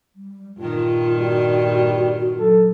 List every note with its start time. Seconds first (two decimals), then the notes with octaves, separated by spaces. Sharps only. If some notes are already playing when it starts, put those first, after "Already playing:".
0.16 G3
0.58 G2 A#2 D#3 F4
1.19 G3 F#4
2.40 F#3 A4